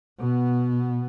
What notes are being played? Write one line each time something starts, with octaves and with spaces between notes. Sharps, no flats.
B2 B3